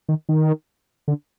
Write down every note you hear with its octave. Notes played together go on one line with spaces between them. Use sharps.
D#3
D#3
D3